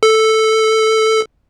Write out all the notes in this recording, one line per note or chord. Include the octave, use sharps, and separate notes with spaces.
A4